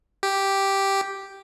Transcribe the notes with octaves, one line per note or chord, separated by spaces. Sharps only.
G4